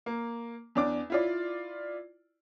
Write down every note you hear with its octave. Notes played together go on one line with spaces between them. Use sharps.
A#3
E2 D4 D6
E4 F4 D5